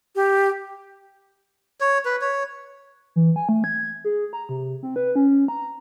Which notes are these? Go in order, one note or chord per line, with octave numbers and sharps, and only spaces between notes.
G4
C#5
B4
C#5
E3
G#5
A3
G#6
G#4
A#5
C3
C4
B4
C#4
A#5